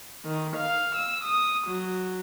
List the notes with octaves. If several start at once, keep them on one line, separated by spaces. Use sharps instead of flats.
D#3
F5
E6
D#6
F#3